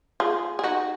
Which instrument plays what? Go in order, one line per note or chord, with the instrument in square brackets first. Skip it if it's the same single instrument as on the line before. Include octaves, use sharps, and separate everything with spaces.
[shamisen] F4 G#4
G#4
D#4 F#4